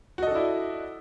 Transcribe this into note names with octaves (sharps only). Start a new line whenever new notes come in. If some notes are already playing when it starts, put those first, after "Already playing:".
D4 E4 F#4 A4 D#5